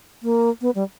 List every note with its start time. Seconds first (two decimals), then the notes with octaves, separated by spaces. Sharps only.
0.23 A#3
0.61 B3
0.75 G3